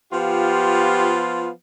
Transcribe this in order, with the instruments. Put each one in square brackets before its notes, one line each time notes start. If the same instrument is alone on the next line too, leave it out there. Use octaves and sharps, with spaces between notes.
[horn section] F3 B3 F4 [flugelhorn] G4